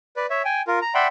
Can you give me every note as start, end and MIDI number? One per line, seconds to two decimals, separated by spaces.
0.16 0.26 71
0.16 0.26 74
0.30 0.42 73
0.30 0.42 76
0.45 0.62 79
0.45 0.62 80
0.67 0.79 65
0.67 0.79 70
0.82 0.94 82
0.94 1.08 74
0.94 1.08 76
0.94 1.08 78
0.94 1.08 79
0.94 1.08 83
0.94 1.08 84